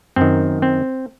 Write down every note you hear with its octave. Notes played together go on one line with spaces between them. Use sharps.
F#2 D#3 C4
C4